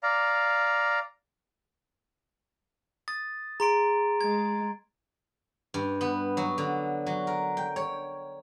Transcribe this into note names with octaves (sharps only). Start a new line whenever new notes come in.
D5 F5 A#5
D#6 A6
G#4 A#5 C6 D7
G#3 G#6
G2
B3
F#3
D3
F#3
A#4
G5
C#5